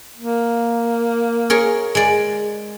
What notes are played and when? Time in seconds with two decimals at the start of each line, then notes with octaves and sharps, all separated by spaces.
0.18 A#3
1.50 G#4 A#4 C#5
1.95 G#3 D5